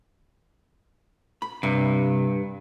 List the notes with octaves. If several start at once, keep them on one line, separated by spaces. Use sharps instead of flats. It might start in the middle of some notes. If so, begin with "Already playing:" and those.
B5
G2 C3